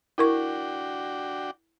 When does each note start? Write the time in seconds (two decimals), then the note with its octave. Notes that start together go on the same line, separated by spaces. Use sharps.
0.18 D4 E4 F#4 A#4 G5 C#6